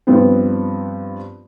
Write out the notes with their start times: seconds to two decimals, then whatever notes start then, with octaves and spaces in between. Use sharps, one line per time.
0.07 G2 F3 B3 C4